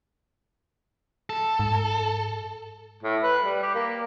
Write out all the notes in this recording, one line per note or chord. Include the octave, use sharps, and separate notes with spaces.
A4
G#2
A2
B4
G3
G4
A#3